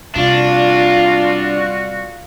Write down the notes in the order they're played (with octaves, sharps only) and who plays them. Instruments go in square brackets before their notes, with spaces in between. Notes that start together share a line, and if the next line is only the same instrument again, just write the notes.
[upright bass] C3 [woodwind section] G3 F#4 [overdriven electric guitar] D4 [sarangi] F4